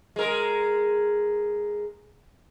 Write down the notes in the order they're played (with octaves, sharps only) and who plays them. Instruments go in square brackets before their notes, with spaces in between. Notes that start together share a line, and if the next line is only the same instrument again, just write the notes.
[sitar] G#3 A#4